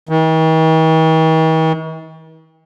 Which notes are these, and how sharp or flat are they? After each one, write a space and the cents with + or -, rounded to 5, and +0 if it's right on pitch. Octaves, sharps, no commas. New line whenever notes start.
D#3 +45